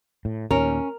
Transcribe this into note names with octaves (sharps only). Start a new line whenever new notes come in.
A2
D#2 A#2 C#4 A#4